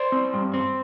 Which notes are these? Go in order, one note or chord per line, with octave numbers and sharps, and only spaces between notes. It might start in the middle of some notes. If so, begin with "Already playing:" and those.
Already playing: C5 D5
C4
G2
C4